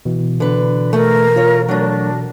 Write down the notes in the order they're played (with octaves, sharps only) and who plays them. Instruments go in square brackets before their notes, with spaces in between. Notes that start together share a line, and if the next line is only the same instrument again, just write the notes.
[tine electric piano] B2 E3
[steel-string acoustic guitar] D3 B4
[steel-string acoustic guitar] A3 E5 [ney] A#4
[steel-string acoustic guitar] F4 C#5
[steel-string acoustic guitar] F#3 A3 [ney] D4